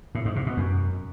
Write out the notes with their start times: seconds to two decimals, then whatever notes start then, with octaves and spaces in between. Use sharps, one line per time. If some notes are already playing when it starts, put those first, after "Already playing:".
0.15 A2
0.25 G#2
0.36 C3
0.46 B2
0.57 F#2